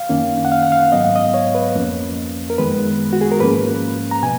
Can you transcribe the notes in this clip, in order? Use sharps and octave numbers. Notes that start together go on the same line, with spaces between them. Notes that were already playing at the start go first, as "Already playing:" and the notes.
Already playing: F5
F#2 D#3 A#3 C#4
F#5
F5
F#5
F5
G#2 F#3 B3 D#5
F5
D#5
C#5
B4
F2 F3 A#3 C#4
A#4
F#2 D#3 G#3 B3 B4
F#4
G#4
A#4
G#2 F3 A#3 C#4 B4
A#5
B2 G#5